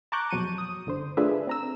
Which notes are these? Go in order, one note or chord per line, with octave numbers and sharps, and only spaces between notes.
A5 A#5 C#6 D6 F#6 G6
F2 B2 F#3 C#6 D#7
D#6
G1 D3 C5
A3 D4 F4 G#4 B4 E5
C4 A#5 E6